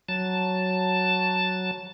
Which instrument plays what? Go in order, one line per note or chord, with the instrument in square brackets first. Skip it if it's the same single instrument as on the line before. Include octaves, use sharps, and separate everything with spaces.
[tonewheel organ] F#3 A5